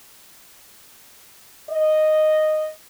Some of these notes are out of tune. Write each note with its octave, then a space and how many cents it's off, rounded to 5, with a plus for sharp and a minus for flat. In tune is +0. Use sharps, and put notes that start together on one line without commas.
D#5 -5